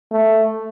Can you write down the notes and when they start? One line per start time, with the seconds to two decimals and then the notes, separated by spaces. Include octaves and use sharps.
0.11 A3